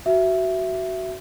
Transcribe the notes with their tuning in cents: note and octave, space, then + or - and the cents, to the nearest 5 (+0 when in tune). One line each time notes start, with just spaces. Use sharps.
F#4 +15 E5 +10